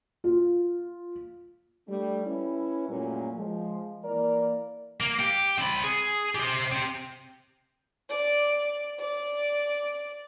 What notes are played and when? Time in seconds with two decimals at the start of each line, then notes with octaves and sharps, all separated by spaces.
0.24 F4
1.88 G3 A3 D4
2.25 C#4 E4 B4
2.88 F#2 A#2 F#3 G3 A3 C#4
3.36 F3 G#3
4.04 E3 A#3 A#4 D5
5.00 A#3
5.19 G4
5.58 C4 B5
5.83 G#4
6.35 G4 C5
6.72 C4 G4
8.11 D5
9.00 D5